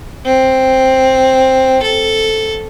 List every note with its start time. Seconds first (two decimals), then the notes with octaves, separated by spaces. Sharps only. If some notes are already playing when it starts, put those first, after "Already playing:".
0.25 C4
1.82 A4